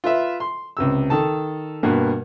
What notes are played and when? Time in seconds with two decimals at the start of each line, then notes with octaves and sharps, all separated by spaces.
0.04 F4 B4 E5
0.40 C6
0.77 C#2 C3 E6
1.10 D#3 A4 A5
1.83 G2 B2 A#3 B4